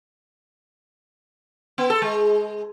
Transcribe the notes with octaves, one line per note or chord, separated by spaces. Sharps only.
B3
A4
G#3